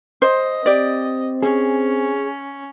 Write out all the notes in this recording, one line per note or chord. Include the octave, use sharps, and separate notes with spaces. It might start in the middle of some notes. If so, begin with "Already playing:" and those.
C5 D#5
C4 G4 D5
C#4 G#4